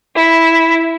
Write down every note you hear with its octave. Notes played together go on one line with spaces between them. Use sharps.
E4